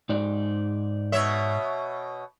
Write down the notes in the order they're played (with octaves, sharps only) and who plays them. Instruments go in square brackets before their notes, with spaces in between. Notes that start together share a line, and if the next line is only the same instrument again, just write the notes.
[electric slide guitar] G#2 D#4 D5
[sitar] B2 C#5 E5